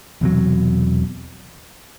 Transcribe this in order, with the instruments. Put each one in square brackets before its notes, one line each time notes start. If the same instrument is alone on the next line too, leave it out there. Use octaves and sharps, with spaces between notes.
[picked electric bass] E1 E2 C3 F#3